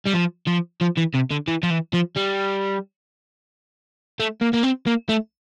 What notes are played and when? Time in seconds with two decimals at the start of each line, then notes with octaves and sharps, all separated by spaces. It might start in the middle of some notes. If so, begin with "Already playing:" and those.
0.06 G3
0.13 F3
0.47 F3
0.81 F3
0.97 E3
1.14 C3
1.31 D3
1.48 E3
1.63 F3
1.70 E3
1.93 F3
2.16 G3
4.20 A3
4.42 A#3
4.54 A#3
4.64 C4
4.87 A#3
5.09 A3